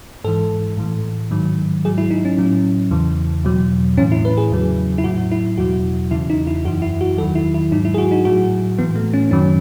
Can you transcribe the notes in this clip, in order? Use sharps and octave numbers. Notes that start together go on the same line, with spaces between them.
G#2 E3 A4
A2 E3
G#2 D#3 F#3
G#2 F#3 G#4
E4
D#4
C#4
A2 F#3
E2 C#3 E3
E2 B2 F#3
A2 E3 C#4
E4
B4
G#4
E2 C#3 F#3
E4
A2 F#3 F#4
E4
E2 B2 F#3 F#4
E2 C#3 E3 E4
D#4
E4
F#2 E3 F#4
E4
F#4
E2 D#3 F#3 A4
E4
E4
G#2 F#3 D#4
E4
G#4
F#4
D#4
A2 F#3 F#4
A2 E3 B3
A3
C#4
F#2 D#3 F#3 C#4